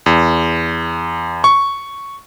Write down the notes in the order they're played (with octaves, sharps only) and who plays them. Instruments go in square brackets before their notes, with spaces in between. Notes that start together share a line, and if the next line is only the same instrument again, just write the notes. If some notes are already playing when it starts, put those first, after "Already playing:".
[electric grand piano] E2
C#6